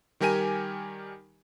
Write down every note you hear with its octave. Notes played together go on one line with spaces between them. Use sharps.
D#3 G3 G4 A#4 G#5 D#7